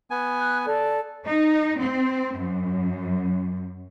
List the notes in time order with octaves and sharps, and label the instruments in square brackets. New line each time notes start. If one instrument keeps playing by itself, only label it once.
[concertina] B3 G#5
[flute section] F#6
A4 D5
[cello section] D#4
C4
F#2